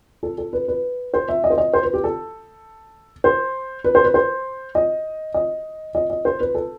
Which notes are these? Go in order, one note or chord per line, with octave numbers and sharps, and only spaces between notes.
A4
A4
B4
B4
C5
E5
D#5
C5
D#5
C5
B4
G4
A4
C5
B4
C5
B4
C5
D#5
D#5
D#5
D#5
C5
B4
A4